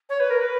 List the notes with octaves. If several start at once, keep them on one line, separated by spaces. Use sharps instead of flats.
C#5
B4
A#4
B4